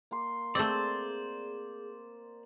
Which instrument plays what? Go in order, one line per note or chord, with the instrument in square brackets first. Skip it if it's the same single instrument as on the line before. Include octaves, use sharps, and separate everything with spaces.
[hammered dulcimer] A#3 C6
[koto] A3 C4 [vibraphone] G#4 [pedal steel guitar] C5 D5